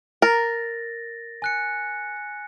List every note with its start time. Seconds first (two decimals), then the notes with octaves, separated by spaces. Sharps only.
0.22 A#4 A6 A#6
1.42 G#5 F#6 C#7